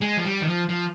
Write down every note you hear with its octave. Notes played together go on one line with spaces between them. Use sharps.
G#3
F3
G3
D#3
F3
F3